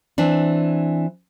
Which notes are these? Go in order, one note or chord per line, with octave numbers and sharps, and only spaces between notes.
E3 C4 D4